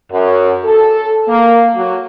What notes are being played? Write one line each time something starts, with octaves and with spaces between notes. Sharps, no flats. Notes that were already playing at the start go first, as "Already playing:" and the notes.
F#2
A4
A#3
F#3